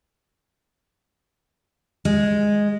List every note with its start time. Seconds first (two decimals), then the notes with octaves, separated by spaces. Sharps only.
2.05 G#3